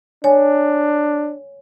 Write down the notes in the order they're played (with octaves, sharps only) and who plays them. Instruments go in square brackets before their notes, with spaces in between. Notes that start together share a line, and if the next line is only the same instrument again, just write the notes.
[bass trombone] D4 [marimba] C#5 G#5